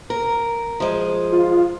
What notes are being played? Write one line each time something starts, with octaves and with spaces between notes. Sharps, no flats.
A#4
F3 G#3
F4